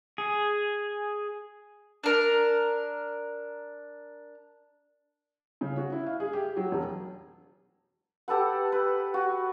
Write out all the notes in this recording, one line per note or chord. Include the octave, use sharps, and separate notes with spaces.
G#4
D4 A#4
C#3
F#4
E4
F5
G#4
G4
F#3
E1
G4 A4 B4 F#5
B4
F#4